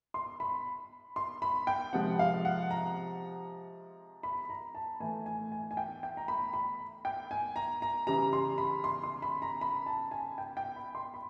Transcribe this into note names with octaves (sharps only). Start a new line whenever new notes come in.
C6
B5
C6
B5
G5
C3 F3 G#3 F#5
F5
F#5
A#5
B5
A#5
A5
A2 E3 A3 G#5
G#5
G#5
G#5
G5
G5
A#5
B5
B5
G5
G#5
A#5
A#5
C#3 E3 G3 A#5
C6
B5
C6
C6
B5
A#5
B5
A5
G#5
G5
G5
B5
C6
B5